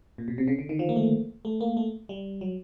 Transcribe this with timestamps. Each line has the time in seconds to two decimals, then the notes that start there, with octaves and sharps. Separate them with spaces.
0.18 A#2
0.28 B2
0.38 C3
0.48 C#3
0.59 D3
0.69 D#3
0.79 F3
0.89 A#3
0.96 A3
1.45 A3
1.61 A#3
1.77 A3
2.09 G3
2.41 F#3